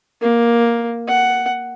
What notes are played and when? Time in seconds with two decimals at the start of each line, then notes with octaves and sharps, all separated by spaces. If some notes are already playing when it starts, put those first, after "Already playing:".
0.21 A#3
1.08 F#5